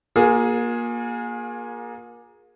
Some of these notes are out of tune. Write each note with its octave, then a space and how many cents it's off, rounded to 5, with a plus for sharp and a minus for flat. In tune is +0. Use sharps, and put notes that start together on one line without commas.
A#3 +20 F4 +45 G#4 +0